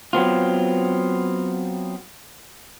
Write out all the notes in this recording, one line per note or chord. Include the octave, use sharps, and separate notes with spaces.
F#3 B3 C4 F4